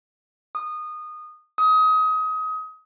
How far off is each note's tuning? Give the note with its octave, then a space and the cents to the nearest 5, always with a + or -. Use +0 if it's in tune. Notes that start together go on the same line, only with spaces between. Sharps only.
D#6 -20
D#6 +25